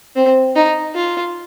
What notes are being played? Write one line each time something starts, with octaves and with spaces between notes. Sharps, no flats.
C4
D#4
F4